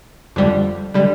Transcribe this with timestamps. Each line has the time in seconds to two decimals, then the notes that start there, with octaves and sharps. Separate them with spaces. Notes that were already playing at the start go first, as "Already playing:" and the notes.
0.36 F2 D3 G3
0.94 D3 G3